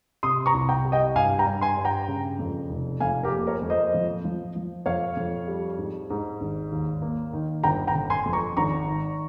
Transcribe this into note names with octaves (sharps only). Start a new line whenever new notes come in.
C3 C6 D#6
A#5 C#6
C2
G5 A#5
G3
D#5 G5
G2 F5 G#5
G5 A#5
G2
G#5 C6
G2
G5 A#5
C#3
F2
F1
F2 F5 G#5
G4 A#4
A#3
A#4 C#5
F2
C5 D#5
F3
F3
F3
F2 C#5 F5
F2
G3
G#2
G#2
G#1
D#2
A#3
D#3
G1 G5 A#5
G5 A#5
G1
G#5 C6
F2
A#5 C#6
G#1 A#5 C#6
D#3